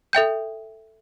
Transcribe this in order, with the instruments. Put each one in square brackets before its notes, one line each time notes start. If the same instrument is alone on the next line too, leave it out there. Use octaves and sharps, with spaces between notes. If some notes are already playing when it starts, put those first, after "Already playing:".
[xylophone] A4 E5 G5 G6